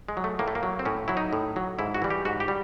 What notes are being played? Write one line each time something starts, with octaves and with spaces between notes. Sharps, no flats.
G#3
F#3
A3
A2 A#3
A3
A#3
F#3
C4
A2 C#4
F#3 E4
D#4
A2
F#3
G#2 E4
F#4
E3 G3
G4
G#2 F#4
G4
G3